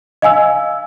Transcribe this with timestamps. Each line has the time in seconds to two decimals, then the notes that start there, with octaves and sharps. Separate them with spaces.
0.22 D#5 F5 G#5 E6